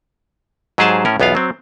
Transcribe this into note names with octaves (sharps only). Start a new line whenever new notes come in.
G#2 F#3 G4 G#4 C5 A5
A2 C#4 A#4
B1 E2 B3 F4 F5
F#3 C4